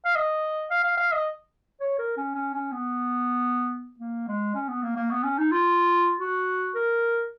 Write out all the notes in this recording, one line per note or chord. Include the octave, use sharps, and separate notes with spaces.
F5
D#5
F5
F5
F5
D#5
C#5
A#4
C#4
C#4
C#4
B3
A#3
G#3
C#4
B3
A#3
A#3
B3
C#4
D#4
F4
F#4
A#4